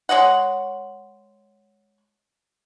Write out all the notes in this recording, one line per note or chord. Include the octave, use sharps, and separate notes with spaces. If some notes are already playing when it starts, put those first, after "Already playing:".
G#3 C#5 D#5 F#5